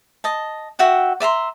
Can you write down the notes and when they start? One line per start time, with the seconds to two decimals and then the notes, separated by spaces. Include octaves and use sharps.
0.24 D#5 A5
0.79 F#4 E5 F#5 G5
1.20 D5 E5 A#5 C6